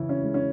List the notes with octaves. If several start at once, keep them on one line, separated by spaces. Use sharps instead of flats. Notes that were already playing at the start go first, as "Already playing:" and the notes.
Already playing: C#3 E3 E4
C#4
G#3
C#4